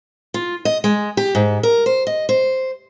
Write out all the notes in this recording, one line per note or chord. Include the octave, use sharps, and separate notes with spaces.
F4
D#5
G#3
G4
G#2
A#4
C5
D#5
C5